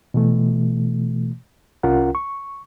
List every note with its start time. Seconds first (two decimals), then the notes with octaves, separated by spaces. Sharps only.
0.14 B2 E3 A3
1.83 C2 C#4 F4 A#4 F#5
2.15 C#6